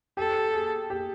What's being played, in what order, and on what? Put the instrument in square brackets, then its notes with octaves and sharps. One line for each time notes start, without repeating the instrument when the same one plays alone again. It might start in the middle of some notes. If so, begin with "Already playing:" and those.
[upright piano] G4 [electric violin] A4
[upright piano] G#4
G4